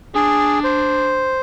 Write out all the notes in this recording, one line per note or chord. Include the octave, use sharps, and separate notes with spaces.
D4 G#4
C5